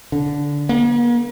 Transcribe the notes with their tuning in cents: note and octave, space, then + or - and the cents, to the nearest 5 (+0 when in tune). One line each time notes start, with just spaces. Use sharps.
D3 -15
A#3 +45